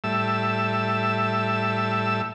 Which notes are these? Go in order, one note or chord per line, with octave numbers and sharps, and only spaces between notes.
A2 G3 E5 A5 E6